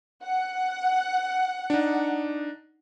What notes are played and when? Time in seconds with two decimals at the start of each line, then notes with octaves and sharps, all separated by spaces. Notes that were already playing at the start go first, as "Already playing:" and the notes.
0.23 F#5
1.70 D4 D#4